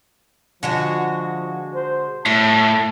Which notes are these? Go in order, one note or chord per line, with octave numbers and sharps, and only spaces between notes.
D3 F3 G#3 F#4
C5
A2 A3 A5